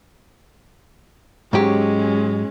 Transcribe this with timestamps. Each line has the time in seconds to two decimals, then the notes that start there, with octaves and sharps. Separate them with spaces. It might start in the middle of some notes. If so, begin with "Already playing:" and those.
1.53 G#2 F#3 G#3 C#4 G4